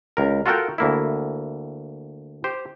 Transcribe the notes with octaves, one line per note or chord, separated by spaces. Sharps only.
C#2 A#4
F4 F#4 A4 A#4 F#5 G5
D2 A#3 E4
G4 C5